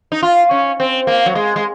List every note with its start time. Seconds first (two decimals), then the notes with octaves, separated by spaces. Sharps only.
0.12 D#4
0.23 F4
0.51 C#4
0.80 C4
1.07 A#3
1.26 F#3
1.35 G#3
1.56 G#3